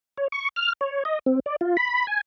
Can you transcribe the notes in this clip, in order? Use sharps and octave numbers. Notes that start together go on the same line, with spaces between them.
C#5
C#6
F6
C#5
D#5
C4
D5
F4
B5
G#5